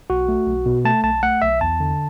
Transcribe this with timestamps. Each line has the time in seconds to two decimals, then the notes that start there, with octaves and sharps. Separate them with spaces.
0.10 B1 F#4
0.28 A3
0.47 B1
0.66 B2
0.85 A3 A5
1.04 B1 A5
1.23 A3 F#5
1.42 B1 E5
1.61 E2 A5
1.80 D3